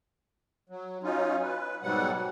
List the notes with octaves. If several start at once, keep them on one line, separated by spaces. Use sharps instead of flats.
F#3
F#3 C#4 D#4 F4
B4
G#2 B2 F#3 G3 F#5